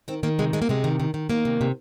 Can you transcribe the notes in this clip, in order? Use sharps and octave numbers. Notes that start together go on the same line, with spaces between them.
D#3 C4
D#3 A#3
C3 G#3
C3 G#3
A#3
C3 G#3
D#3
D#3
D#3
D#3 A#3
C3
C3